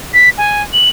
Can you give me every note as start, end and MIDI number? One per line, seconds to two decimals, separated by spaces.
0.14 0.30 95
0.38 0.63 80
0.73 0.89 102